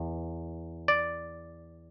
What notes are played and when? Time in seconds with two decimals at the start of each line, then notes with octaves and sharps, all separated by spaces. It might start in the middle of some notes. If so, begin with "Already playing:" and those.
Already playing: E2
0.88 D5